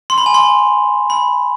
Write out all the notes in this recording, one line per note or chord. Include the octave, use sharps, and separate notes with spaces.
C6
B5
G#5
C6
B5